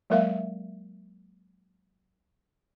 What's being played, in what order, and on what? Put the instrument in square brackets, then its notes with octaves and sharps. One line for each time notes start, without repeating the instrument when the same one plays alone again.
[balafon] F#3 G#3 A#3 A#4 E5 F5